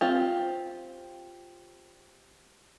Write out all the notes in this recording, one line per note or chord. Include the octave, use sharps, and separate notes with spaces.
C4 F4 G4